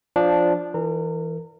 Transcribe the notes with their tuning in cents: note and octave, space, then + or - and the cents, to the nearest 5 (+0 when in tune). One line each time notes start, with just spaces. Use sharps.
F3 +0 D4 -5
E3 +0 A#4 -40 A#5 -35